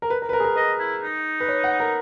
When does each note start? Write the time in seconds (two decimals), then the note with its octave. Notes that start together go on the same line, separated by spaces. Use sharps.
0.02 A#4
0.10 B4
0.22 A#4
0.29 B4
0.33 A#4
0.40 G#4
0.44 A#4
0.56 B4 D#5
0.79 E4
1.02 D#4
1.40 B4
1.48 C#5
1.64 F#5
1.80 A#4